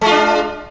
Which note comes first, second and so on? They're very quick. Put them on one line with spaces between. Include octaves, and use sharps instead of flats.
G#3 F4 D4